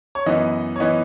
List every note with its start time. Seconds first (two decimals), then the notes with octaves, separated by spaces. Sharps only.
0.15 C#5
0.26 F#2 E3 B3 D#5
0.76 C#5
0.80 E3 B3 D#5